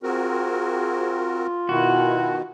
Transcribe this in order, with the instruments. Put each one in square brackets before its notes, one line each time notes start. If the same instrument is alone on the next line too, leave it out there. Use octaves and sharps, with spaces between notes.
[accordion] C4 F#4 A#4 [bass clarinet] F4 [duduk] G#4
[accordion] B2 D#3 [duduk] E4 [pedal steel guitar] F#4